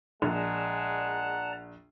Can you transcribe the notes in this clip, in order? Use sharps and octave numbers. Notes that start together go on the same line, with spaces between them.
A#1 G#3 D5 F#5 A5 A#5